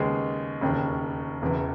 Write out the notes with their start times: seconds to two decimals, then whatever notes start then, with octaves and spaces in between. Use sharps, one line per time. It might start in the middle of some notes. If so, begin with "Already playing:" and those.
Already playing: D#2 C#3 G#3 B3
0.61 E1 D#2 C#3
1.42 E1 E2 C#3 E3